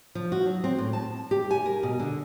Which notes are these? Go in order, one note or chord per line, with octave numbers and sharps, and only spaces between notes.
F3
F#4
F#3
C4
A2
A5
G4
G#5
A#4
B2
D3